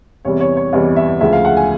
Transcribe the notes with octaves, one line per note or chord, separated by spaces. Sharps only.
E2 C3 E3 G3 C#5
C#5
C#5
E2 C3 E3 G3 D#5
E5
D2 C#3 F3 G#3 E5
F5
F#5
G#5